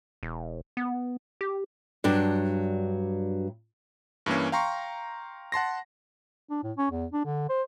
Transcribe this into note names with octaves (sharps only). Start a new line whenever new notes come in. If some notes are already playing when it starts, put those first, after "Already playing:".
E1
B3
G4
G2 F#3 D4
G2 E3 A#3 C#4
F5 G5 A#5 C6 C#6
F#5 A5 C6 A#6
D4
A2
C#4
E2
D4
D3
C5